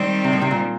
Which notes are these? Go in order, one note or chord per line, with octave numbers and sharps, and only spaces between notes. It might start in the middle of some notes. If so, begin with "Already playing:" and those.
Already playing: D#3 G3 C4
C3
A2
C3
A#2